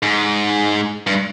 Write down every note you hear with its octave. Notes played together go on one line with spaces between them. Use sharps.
G#2
G2